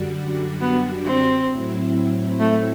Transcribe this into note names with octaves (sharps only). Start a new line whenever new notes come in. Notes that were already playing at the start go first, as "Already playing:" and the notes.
Already playing: F#2 D3 G3 D4 F#4
B3
C4
A2 F#3 C4 E4
A3